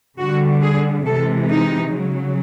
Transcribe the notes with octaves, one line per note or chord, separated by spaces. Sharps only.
D3 G3 F#4
G#4
C3 E3 G#3 A4
D#4
C#3 F#3